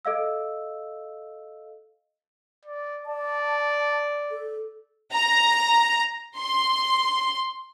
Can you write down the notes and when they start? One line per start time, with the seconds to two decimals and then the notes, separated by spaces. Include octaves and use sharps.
0.05 A4 D#5 F5 E6
2.65 D5
3.06 D5 A5
4.31 A4
5.13 A#5
6.38 C6